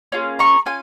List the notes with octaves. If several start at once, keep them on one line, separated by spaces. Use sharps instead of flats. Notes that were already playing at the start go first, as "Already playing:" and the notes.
A#3 C#4 F4 G#4
A#5 C#6
C#4 F4 G#5